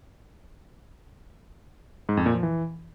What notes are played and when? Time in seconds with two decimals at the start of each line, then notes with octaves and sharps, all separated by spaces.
2.09 G#2
2.17 F2
2.26 A#2
2.34 F3
2.43 E3